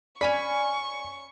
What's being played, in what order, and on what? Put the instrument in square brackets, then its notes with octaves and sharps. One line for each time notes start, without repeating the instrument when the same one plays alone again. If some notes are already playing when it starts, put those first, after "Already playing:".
[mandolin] C#4 G#5 B5 [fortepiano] D5 [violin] C#6